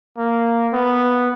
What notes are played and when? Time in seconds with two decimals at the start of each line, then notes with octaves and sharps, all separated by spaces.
0.18 A#3
0.73 B3